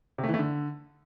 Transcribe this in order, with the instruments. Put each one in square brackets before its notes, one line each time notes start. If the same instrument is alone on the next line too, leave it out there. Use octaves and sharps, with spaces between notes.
[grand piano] C3
A3
E3
A3
D3